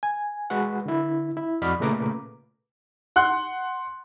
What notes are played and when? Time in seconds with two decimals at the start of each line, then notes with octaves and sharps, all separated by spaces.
0.03 G#5
0.50 G#3 F#4 B4 F#5
0.86 D3 E4
1.37 E4
1.62 F2 F#4 D5 D#5 B5 F6
1.80 A#2 C#3 A3 B4 A#5 D6
3.16 F#5 C6 F#6